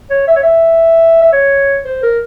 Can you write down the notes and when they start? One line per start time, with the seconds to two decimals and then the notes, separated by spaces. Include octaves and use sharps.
0.10 C#5
0.28 E5
0.36 C#5
0.43 E5
1.21 E5
1.32 C#5
1.85 C5
2.03 A#4